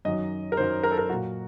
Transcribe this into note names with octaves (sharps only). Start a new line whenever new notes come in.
F#2 D#3 F#3 D#5
A#4
F#2 D#3 F#3 C5
A#4
A4
A#4
A#2 F#3 F#4